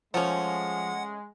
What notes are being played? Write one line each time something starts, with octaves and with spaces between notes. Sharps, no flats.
F3 G#3 A3 C#4 F#5